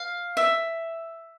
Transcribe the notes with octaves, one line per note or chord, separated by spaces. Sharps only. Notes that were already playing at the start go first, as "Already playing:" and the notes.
Already playing: F5
E5